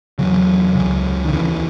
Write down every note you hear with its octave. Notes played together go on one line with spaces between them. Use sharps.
E2 C#3 F#3
C#2 C#3
D#3
D#2 C#3 E3